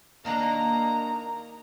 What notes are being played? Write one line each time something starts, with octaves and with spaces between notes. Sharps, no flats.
D#3 A#3 D4 A#5